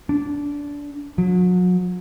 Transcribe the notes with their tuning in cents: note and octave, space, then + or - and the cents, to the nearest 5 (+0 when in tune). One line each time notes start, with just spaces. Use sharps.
D4 -20
F#3 -35